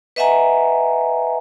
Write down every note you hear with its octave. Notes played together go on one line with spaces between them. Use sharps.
B4 D#5 E5 F#5 G#5 A#5